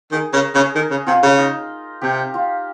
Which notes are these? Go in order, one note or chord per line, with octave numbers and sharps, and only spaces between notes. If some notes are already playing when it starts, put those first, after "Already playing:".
D#3 G#4
C#3 A#4
C#3 G#4
D#3
C#3
C3 F4
C#3
D#4
C3 G4
F4